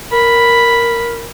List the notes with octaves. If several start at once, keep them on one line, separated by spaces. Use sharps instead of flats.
A#4 B5